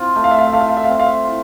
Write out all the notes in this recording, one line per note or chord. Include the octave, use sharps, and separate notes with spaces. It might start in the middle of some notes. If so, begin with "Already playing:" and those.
Already playing: C4 F4
A3 E5
F5
E5
F5
E5
A3 F5
E5
F5
E5
F5
C4 E5
F5
E5
F4